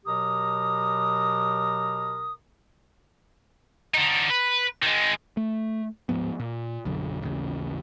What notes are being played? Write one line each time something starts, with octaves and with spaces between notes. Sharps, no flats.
B2 F#3 G4 A#4 A#5 D#6
D3 D#4
B4
D#3 G#3
A3
D1 G#2 F3 B3
A#2
B1 F#2 D3
A1 D#2 C#3